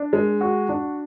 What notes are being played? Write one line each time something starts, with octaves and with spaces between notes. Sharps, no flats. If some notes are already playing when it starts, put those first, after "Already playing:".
Already playing: D4
G#3
F#4
D4